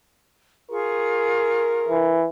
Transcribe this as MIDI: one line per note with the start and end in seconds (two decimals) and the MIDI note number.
0.71 1.97 65
0.71 1.97 68
0.71 2.23 70
0.71 1.97 85
1.89 2.27 52